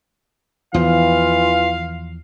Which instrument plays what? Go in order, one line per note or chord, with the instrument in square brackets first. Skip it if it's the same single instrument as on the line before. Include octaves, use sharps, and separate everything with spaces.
[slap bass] E2 F3 [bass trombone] E3 [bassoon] F4 [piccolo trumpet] F5